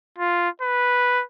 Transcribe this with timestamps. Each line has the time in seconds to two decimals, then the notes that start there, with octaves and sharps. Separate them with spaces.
0.18 F4
0.62 B4